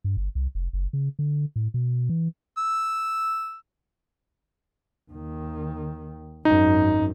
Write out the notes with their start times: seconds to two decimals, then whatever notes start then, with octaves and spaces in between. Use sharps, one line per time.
0.04 G2
0.17 G1
0.35 C2
0.55 F1
0.73 F#1
0.93 C#3
1.19 D3
1.56 A2
1.74 B2
2.09 E3
2.58 E6
5.11 D#2 D#3
6.45 G#1 F#2 D#4